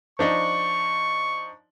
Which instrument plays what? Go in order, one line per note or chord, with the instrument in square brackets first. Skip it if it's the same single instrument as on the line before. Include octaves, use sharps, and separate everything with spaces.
[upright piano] F3 D4 D#4 [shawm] C#6